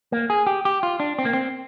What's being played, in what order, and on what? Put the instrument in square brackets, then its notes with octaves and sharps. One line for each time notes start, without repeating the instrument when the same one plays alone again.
[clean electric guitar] A#3
G#4
G4
G4
F4
D4
C4
A#3
C4